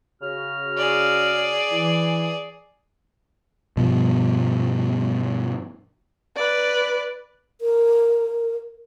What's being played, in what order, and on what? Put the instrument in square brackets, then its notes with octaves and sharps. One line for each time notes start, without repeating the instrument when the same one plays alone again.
[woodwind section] C#3 F#4 F6
[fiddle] G#4 D5
[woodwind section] E3
[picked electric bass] G2 B2 F3
[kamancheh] B4 D5
[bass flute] A#4